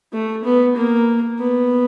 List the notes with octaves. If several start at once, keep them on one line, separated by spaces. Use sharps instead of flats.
A3
B3
A#3
B3